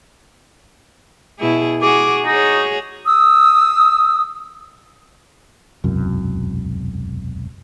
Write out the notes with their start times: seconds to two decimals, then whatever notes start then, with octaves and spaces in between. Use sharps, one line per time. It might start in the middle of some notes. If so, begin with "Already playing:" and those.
1.39 B2 E4 G#4
1.82 F#4 G#4 D6
2.25 D#4 F#4 G#4 C#5
3.06 D#6 E6
5.84 E1 C2 F#2